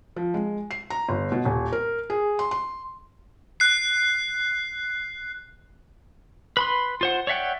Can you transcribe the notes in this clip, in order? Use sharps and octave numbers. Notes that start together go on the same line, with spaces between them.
F3
G#3
C7
A#5
G1
B2
D#1
A#4
G#4
C6
C6
F#6 C7
B4 B5 C6
F4 C5 F#5
C#5 D5 E5 F#5 G5